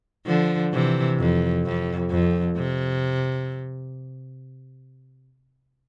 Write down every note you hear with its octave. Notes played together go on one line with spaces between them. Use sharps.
D3 F3
C3 E3
F2
F2
F2
C3